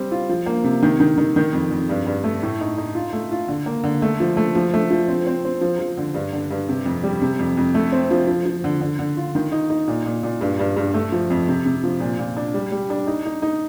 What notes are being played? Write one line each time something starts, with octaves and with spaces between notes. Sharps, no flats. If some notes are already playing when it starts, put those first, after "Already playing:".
Already playing: G3 C4
F4
F3
A#3
C3
D#3
D#3
D#3
D#3
F2
F2
G2
G2
A3
A2
D#4
D#4
F4
A3
F4
D3
A#3
D3
A3
F3
A3
F3
A3
F3
C4
C4
C4
F3
F3
D3
G2
D3
G2
C3
F2
G3
C3
F2
F2
A3
C4
F3
F3
F3
D3
D3
D3
F4
D#3
D#4
D#4
A#2
A#2
A#2
G2
G2
G2
A3
F3
F2
C3
C3
F3
A#2
A#2
D4
G3
G3
D4
D#4
D#4
D#4